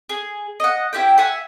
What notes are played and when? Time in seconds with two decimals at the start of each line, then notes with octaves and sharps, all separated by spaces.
0.09 G#4
0.60 D#5 F#5
0.93 E4 G4 C5 G5
1.18 E5 F#5 G#5